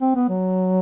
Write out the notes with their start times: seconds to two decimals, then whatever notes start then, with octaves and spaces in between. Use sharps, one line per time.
0.01 C4
0.15 B3
0.29 F#3